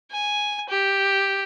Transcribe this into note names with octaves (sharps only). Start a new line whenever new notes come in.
G#5
G4